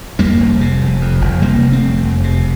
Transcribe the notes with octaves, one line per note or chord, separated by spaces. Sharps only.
F2 G3 A#3
F1
C3
F1
F2
F1
C3 G3 A#3
F1
A3 C4
F2
F1
C3